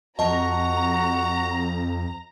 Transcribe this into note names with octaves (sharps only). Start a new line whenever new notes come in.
F2 F#4 D#5 A5 A#5